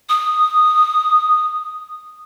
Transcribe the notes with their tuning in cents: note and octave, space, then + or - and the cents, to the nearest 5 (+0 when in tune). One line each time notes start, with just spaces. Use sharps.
D#6 -10